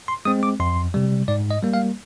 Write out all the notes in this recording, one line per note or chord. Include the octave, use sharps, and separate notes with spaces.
C6
G#3 C4 D#6
D6
F2 C6
C3 G3
G#2 D5
D#5
G3 A#3
F5